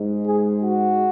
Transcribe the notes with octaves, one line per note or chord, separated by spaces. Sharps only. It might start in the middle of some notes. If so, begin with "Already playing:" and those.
Already playing: G#2 G#3
G#4
F#4